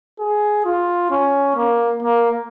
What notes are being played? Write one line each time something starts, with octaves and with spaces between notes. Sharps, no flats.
G#4
F4
C#4
A#3
A#3